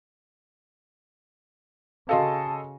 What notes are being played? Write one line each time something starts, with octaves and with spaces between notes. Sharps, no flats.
C#3 F#4 A4 D#5 F5 A5 C6